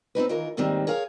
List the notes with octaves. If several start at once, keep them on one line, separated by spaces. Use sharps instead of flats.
C4 D4 D#4 B4
D#3 E3 F4 A#4
D#2 G#2 D#3 G3 C4
G#4 A#4 C#5 F5